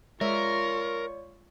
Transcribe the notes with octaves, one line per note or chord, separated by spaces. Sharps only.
G#3 F4 A#4 C#5 D5 E5 C#6